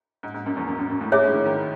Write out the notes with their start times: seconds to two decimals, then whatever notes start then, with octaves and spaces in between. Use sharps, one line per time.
0.23 G#2
0.34 G#2
0.46 F#2
0.56 E2
0.68 F#2
0.79 F#2
0.90 F#2
1.01 A2
1.12 G#2 G#4 C#5 E5
1.23 A2
1.34 D#3
1.46 D#3